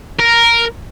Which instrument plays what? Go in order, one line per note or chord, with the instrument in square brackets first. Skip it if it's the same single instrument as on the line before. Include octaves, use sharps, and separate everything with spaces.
[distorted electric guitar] A#4